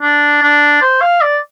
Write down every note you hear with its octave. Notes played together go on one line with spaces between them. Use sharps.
D4
D4
C5
F5
D5